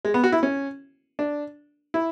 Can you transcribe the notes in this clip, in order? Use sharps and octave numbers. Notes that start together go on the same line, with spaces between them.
G#3
B3
F#4
E4
C#4
D4
E4